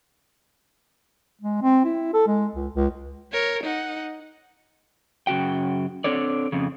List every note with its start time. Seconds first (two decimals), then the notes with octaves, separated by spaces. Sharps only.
1.42 G#3
1.62 C4
1.85 E4
2.14 A4
2.27 G#3
2.55 C#2
2.75 C#2
3.32 A#4 C#5
3.64 D#4 F#5
5.27 F#2 C#3 F#4 G5
6.04 C4 D4 A4 C#5 D5
6.52 F2 C#3